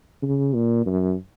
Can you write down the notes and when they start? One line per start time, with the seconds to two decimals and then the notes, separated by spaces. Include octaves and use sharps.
0.23 C#3
0.55 A#2
0.87 F#2